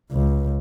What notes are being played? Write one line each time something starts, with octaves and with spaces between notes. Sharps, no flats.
C#2